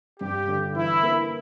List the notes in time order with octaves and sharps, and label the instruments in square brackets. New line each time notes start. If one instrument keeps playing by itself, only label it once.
[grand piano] G2 [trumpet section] G4
[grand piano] D3
[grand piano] E3 [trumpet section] E4
[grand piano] A#3